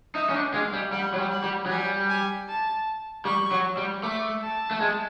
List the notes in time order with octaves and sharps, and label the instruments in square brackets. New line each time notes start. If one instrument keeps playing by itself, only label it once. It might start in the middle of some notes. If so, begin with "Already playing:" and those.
[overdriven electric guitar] D#4 [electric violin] E5
[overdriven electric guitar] C#4
D4
[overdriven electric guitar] G#3 [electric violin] F5
[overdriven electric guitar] G3
[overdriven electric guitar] G3 [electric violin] F#5
[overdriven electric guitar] F#3
G3
[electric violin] F#5
[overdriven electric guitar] G3
F#3
[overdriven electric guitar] G3 [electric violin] G#5
[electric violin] G#5
A5
[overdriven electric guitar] G3 [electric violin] C#6
[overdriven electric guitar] F#3
G3
[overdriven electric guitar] A3 [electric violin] D6
[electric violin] A5
[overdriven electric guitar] A3
G#3